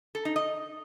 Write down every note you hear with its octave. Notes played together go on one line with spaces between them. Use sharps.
A4
D#4
D#5